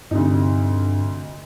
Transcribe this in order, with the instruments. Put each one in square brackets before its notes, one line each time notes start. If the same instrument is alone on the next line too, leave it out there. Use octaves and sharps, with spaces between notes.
[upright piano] D2 C3 D#4 [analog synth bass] G2